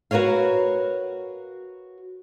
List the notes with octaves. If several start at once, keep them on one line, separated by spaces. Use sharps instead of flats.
F#4 A#4 B4 C#5 F5